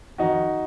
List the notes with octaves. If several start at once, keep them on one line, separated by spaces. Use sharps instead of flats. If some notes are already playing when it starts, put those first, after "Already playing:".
F2 D#3 D#4 F#4